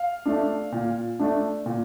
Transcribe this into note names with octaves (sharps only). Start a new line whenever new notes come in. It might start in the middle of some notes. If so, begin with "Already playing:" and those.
Already playing: F5
A3 D4
A#2
A3 D4
A#2